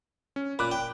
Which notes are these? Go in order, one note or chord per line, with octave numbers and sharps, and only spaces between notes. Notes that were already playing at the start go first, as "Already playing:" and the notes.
C#4
A#2 B5 D6 F#6
G5